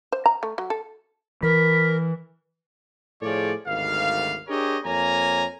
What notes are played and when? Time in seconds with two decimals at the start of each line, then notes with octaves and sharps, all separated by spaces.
0.12 C5
0.26 A#5
0.43 A3
0.58 F#3
0.70 A4
1.43 E3 A#4 B5
3.22 A2 F3 G#4 C#5 D5
3.66 G#1 D2 D#3 G3 F5
4.48 D4 G4 G#4 A#4 C#5 D#5
4.84 F2 A#3 C#5 G#5 A#5